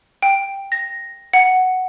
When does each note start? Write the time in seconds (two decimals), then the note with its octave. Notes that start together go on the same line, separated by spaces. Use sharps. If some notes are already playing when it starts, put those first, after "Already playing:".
0.23 G5
0.72 A#6
1.33 F#5